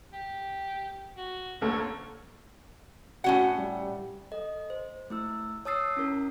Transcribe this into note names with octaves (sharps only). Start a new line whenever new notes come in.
G4
F#4
D2 A#3 A4 C#5
A2 C#4 F#4 F#5
G3
A4 D#5
C5
A3 E4 E6
C#5 A5 D#6 E6 A6 C7
C#4 E4 A#4